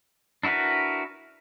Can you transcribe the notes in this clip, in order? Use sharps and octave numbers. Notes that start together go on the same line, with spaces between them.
D4 E4 F#4 A#4 B4